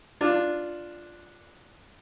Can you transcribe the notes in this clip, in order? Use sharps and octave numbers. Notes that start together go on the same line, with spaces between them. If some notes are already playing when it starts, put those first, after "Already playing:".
D4 F4